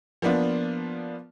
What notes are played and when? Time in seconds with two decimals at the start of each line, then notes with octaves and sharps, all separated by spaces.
0.22 F3 A#3 B3 D4 F4